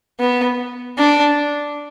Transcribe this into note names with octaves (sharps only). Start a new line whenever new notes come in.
B3
D4